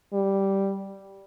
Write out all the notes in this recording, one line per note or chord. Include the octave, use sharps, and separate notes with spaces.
G3